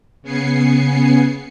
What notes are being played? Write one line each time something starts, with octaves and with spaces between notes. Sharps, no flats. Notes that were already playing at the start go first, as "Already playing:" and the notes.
C#3 B3 G#5 C7 C#7